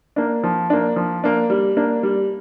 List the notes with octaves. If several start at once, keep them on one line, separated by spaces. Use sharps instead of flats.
A#3 D4
F3
A#3 D4
F3
A#3 D4
G3
A#3 D4
G3